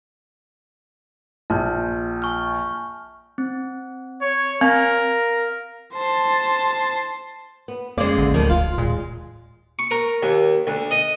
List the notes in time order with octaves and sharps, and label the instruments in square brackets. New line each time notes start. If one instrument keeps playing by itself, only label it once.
[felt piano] A#1 [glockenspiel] A5 F6 G6
[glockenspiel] G#5 C#6 F6
[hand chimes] C4
[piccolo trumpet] C#5
[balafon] C4 [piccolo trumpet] A#4 [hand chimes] F5
[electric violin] C5 A5
[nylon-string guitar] B3
[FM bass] F2 [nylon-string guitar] C#3 G#3 D5 [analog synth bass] A#3
[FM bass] A1 [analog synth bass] D3
[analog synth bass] D2 [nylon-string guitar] A2 D#3 [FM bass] F3
[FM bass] E1 [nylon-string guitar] F4
[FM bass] D#2 [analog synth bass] A#2 [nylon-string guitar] G#3
[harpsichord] C#6
A#4
D#2
D2
D#5